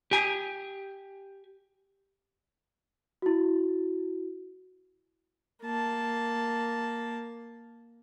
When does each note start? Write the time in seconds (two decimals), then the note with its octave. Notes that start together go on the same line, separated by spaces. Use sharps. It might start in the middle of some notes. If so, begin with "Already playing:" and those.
0.11 G4 G#5
3.22 E4 F#4
5.63 A#3 A5